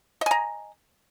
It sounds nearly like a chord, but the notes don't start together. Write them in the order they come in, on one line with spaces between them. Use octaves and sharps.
D#5 G#5 A#5